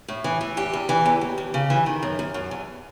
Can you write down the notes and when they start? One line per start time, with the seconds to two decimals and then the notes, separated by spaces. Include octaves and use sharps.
0.08 A2
0.24 E3
0.41 E3
0.57 E2 G4
0.73 E2
0.89 E3
1.06 E2
1.21 D#2
1.38 D#2
1.54 C#3
1.70 E3
1.86 D#3
2.03 F#2
2.19 F#2
2.34 F#2
2.51 E2